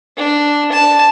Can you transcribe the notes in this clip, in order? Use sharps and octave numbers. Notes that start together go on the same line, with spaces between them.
D4
A5